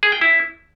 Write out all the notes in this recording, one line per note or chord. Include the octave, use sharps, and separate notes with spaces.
G#4
G5
E4